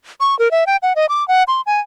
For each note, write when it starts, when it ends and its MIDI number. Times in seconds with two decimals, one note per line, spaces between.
0.20 0.38 85
0.39 0.51 70
0.51 0.64 76
0.67 0.77 79
0.83 0.93 78
0.96 1.06 75
1.09 1.26 86
1.28 1.43 78
1.48 1.61 84
1.66 1.80 80